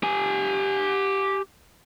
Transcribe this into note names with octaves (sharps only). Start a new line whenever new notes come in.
G4 G#5